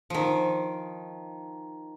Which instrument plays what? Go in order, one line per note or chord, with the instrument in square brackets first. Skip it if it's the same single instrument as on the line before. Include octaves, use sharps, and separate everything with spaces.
[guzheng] D#3 F3